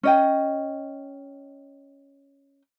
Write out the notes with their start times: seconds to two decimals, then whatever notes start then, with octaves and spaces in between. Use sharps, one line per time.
0.03 C#4 D#5 G5